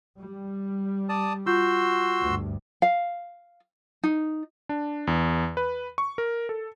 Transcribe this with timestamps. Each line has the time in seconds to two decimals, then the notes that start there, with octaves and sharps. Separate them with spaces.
0.17 G3
1.09 D5 A5 D#6
1.46 F4 F#4 C6 E6 G6
2.22 D2 G2
2.82 F5
4.03 D#4
4.69 D4
5.07 E2
5.57 B4
5.98 C#6
6.18 A#4
6.49 A4